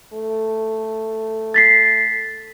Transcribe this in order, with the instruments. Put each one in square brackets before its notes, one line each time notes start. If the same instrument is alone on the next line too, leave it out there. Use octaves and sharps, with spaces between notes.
[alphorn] A3
[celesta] A6 B6 C7